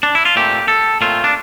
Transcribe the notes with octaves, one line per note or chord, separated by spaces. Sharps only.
D4
E4
F4
A#2 A3 C4 G4
A4
A#2 A3 C4 F4
D4